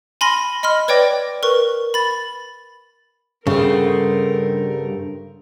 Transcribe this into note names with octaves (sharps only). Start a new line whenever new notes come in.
G#5 B5 C6 F6 A#6
D#5 B5 C6 F6
B4 C#5 D5 G5 D6 A#6
A#4 B4 C#6
B5 A6
G2 C#3 A3 B3 C4 A#4